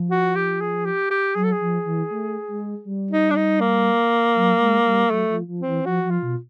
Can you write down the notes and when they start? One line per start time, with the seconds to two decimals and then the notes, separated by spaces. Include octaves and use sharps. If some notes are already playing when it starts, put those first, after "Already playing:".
Already playing: F3
0.10 F#4
0.35 G4
0.61 G#4
0.85 G4
1.10 G4
1.35 F#3 G#4
1.43 A4
1.52 G#4
1.61 F3
1.85 E3
2.11 A3
2.48 G#3
2.85 G3
3.11 D#4
3.30 D4
3.36 D#4
3.60 A#3
4.35 F#3
4.60 G#3
4.86 G3
5.10 F#3 A3
5.30 F3
5.48 F3
5.61 C4
5.67 E3
5.86 F3 F#4
6.04 F3
6.10 F4
6.22 B2